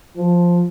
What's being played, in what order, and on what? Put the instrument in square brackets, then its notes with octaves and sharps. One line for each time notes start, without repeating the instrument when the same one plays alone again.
[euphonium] F3